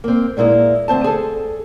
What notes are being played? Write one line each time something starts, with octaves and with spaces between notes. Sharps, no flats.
A#3 C4
A#2 G#3 A#3 E4 D#5
D2 C4 C5 A5
G#4 A4